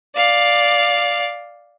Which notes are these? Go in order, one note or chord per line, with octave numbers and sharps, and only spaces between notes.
D5 F5